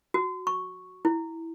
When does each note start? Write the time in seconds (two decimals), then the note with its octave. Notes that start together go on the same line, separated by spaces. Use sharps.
0.14 F#4
0.47 C#6
1.05 E4